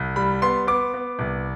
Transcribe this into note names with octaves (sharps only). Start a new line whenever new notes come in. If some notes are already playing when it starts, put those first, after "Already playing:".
Already playing: C2
G3 B5
B3 C6
B3 D6
B3
C2